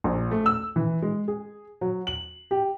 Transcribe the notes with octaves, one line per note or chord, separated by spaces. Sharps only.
A#1
A3
E6
E3
G#3
G#4
F#3
F#7
G4